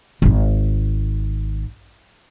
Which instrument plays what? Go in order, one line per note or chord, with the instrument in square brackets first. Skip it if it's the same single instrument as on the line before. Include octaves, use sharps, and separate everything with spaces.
[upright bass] D1 G#1